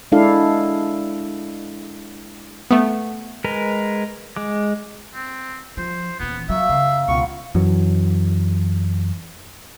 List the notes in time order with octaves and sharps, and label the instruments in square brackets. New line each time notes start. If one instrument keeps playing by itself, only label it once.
[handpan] G#3 D4 E4 A4 F5
[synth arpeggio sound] A3 B3
[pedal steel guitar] G#3 A#4 B4
G#3 D6
[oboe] C4
[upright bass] F3 [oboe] C5
[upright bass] D#1 E3 [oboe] B3
[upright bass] F#3 [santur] A#3 C#6 [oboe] E5
[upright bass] F#2 C#3 [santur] A#3 F5
[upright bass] C#2 B2 [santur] G3 B3 F4 [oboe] C#6
[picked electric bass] F#2 E3 F#3